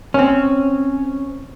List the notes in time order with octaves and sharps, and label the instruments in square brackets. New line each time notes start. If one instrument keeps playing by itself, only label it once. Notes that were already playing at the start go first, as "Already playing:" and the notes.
[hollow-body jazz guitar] C4 C#4